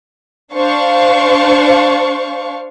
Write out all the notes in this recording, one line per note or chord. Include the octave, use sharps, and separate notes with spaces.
D4 C5 F5 C#6